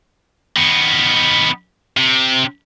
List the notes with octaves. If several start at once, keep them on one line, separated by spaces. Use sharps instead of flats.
D#3 B3
C3